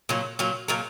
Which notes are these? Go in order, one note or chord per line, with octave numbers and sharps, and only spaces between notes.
A#2 F#3
A#2 F#3
A#2 F#3 A#4